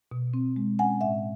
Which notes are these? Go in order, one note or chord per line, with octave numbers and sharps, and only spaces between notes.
B2
C4
G#3
C#4 F#5 G#5
A2 E5 F#5